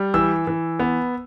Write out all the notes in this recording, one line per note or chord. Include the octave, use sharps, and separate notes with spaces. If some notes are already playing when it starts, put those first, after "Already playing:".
Already playing: G3
E3 E6
E3
B3